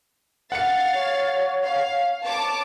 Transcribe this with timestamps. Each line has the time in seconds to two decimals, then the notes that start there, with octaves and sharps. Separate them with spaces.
0.52 F5 F#5 A6 C#7
0.93 C#5
1.65 F5
2.24 C#5 A5 D6